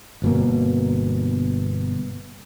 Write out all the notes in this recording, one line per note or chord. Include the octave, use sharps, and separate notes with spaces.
G1 B2 A#3